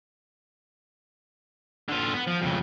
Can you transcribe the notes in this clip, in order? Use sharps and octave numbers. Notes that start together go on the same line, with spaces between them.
D3 F4
B3
F3
F2 C#3